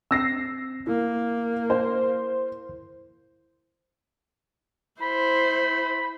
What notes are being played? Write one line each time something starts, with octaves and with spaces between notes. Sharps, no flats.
C4 E6 A#6 C7
A#3 E4
C5
E4 C5 B5